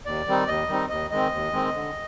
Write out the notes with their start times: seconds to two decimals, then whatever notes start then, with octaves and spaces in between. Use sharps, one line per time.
0.05 D#2 D5
0.27 D#3 G3 C4 D#4
0.47 D#2 D#5
0.68 D#3 G3 C4 D#4
0.89 D#2 D#5
1.11 D#3 G#3 C4 D#5
1.32 D#2
1.53 D#3 G#3 C4
1.74 D3